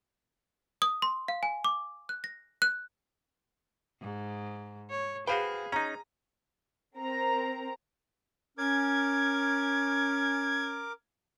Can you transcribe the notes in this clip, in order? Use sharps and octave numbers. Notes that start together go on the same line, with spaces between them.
D#6
C6
F5
G#5
D6
F#6
A#6
F#6
G#2
C#5
F#4 G#4 B4 C5 F5 G5 D#7
C#4 D#4 A#5
C4 A#4 A#5
C#4 A#4 D6 G#6